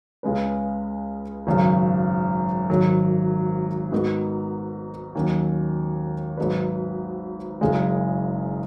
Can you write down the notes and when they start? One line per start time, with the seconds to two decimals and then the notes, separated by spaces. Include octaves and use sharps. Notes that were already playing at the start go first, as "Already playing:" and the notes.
0.23 C#2 C#3 G#3 C#4 B4
1.47 G#1 F#2 C#3
2.70 G#1 G#2 D#3 F#3
3.92 G#2 D#3 B3 D#4 F#4
5.15 D#2 D#3 F#3 C#4
6.37 G#1 G#2 F#3 D#4 B4
7.61 F#1 F#2 C#3 G#3